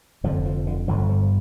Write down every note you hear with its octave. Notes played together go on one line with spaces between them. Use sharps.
F1 F2 D3 F3
F3
D3
G1 G2 D3 F3
F3